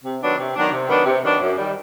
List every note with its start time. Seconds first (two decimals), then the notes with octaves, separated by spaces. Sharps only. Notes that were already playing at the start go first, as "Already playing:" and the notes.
0.04 C3
0.21 D#3 F#3 B3 D4
0.38 C3
0.55 D#3 F#3 B3 D4
0.72 C3
0.89 D#3 F#3 B3 D4
1.05 C3
1.24 D#3 F#3 B3 D4
1.40 F#2
1.57 D#3 G3